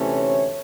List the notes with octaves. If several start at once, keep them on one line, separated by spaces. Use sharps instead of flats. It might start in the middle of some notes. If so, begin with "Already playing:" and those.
Already playing: D2 C3 E3 A3 C#4
C#5